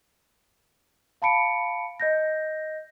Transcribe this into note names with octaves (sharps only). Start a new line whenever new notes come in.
F5 A5 B5 C#7 D7
D#5 G6 A#6